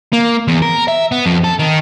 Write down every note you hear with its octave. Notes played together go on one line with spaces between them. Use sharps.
A#3
E2
A#4
E5
B3
F2
A4
D#3